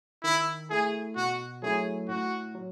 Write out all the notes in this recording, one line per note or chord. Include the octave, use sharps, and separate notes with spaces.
D#3 E4
A3 E4 G#4
B2 F#4
F#3 A3 C#4 E4 G#4
A2 F#4
F#3